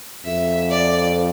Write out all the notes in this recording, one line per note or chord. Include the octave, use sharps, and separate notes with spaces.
F2 E5
D5